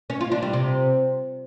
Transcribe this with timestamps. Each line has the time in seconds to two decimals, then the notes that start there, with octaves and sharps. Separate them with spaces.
0.10 C#4
0.21 F4
0.32 D4
0.42 G3
0.53 C3